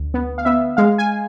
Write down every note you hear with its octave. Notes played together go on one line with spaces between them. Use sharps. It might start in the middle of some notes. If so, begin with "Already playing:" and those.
Already playing: D2
B3
F5
B3 E5
G#3 F5
G#5